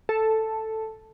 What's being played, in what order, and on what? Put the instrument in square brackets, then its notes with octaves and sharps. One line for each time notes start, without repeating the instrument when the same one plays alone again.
[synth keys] A4